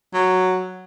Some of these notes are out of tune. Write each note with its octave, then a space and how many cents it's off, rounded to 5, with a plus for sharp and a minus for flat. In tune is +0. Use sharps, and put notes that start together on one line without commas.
F#3 +0